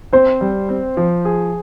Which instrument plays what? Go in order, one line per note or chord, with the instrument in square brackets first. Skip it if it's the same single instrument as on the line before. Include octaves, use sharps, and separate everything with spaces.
[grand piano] C4 [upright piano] C5
[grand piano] G3
C4
F3
G#4